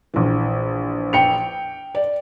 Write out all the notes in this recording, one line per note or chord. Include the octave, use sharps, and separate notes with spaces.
A#1 E3
G5 C#7 F7
D5